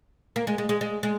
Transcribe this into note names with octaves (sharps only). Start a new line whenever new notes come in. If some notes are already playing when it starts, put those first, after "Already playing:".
A#3
G#3
G#3
G#3
G#3
G#3